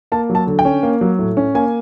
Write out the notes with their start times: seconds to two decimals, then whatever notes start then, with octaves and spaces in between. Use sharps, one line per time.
0.12 A#3 A5
0.30 F#3
0.35 A5
0.47 D3
0.59 G5
0.65 C#4
0.83 A#3
1.01 F#3
1.19 A2
1.37 C#4
1.55 A#3 G#5